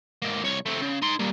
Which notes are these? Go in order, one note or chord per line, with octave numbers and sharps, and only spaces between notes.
G#2 A#3
C2 C#5
A3 C4
C#3
D#4 C6
G3 A#3